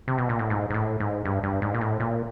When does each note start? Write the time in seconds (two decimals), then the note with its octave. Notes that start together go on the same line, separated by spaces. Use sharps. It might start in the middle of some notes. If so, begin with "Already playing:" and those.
0.08 C3
0.18 B2
0.29 A#2
0.39 A2
0.50 G#2
0.70 G#2
0.74 A2
1.00 G#2
1.25 G2
1.43 G2
1.62 G#2
1.74 A#2
1.81 A2
2.00 A#2